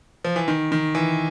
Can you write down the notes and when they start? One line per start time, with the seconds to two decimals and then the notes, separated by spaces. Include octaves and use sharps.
0.25 F3
0.36 E3
0.48 D#3
0.72 D#3
0.95 E3